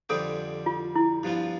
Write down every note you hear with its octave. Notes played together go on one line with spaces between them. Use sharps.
F2 D3 G3 C4 G4 A4
F4
E4
G2 F3 B3 F4